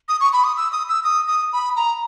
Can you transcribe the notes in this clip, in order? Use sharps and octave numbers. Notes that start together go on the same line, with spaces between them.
D#6
C#6
B5
D#6
E6
D#6
E6
D#6
D#6
B5
A#5